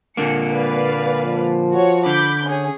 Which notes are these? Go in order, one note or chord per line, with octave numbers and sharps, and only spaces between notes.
A#2 D3 A#3 C#7
B4 D5 F5
F3
F#4 C#5
D3 B5 D6 G6
C#4 G#4